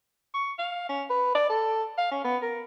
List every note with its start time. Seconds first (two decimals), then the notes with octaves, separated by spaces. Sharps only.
0.34 C#6
0.59 F5
0.89 C#4
1.10 B4
1.35 D5
1.50 A4
1.98 F5
2.11 C#4
2.24 B3
2.42 A#4